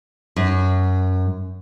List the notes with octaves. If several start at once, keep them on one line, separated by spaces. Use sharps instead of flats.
F#2